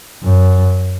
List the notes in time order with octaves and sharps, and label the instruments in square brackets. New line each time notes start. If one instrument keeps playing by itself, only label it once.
[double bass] F#2